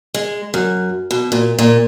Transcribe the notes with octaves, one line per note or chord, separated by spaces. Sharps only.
G#3
F#2
B2
A#2
A#2